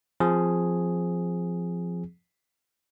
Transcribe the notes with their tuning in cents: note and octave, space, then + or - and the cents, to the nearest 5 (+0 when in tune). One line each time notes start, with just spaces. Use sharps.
F3 +0 C4 +0 G#4 +0